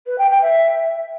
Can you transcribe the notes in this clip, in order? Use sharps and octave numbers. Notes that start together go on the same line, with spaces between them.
B4
G5
G5
E5